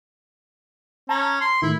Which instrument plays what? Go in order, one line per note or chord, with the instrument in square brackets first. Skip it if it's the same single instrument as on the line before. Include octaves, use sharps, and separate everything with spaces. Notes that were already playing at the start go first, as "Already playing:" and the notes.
[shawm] C#4 [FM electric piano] A5 A#5
[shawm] C6
[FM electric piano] A2 D#3 [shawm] E4